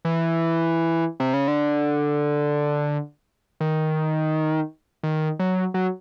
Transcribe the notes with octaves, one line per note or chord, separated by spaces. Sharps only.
E3
C3
C#3
D3
D#3
D#3
F#3
F#3